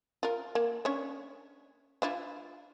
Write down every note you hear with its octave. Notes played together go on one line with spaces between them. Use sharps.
F4 A#4
A#3
C#4 D4 C#5
D4 E4 F4